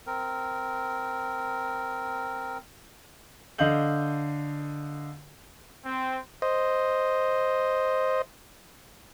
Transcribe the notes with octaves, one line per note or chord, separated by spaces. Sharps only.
C4 A#4
D3 D#5 F5 G6 F#7
C4
C5 D#5